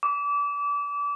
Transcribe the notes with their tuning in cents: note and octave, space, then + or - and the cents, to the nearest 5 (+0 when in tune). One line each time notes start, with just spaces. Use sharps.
D6 -30